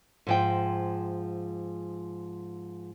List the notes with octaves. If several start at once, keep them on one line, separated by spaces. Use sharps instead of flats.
G#2 F3 G5